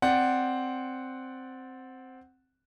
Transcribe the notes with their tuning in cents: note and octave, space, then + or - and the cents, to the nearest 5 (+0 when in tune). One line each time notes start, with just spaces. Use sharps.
C4 +0 D5 +0 F#5 +0